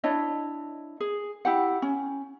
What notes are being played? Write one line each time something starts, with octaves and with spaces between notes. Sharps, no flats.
D4 E4 C#5 D#5
G#4
E4 G4 F#5
C#4